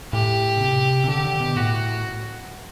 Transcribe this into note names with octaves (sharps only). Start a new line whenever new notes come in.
A2 G4
B2
C3
C3
D3 G4
D3
B2
A2 F#4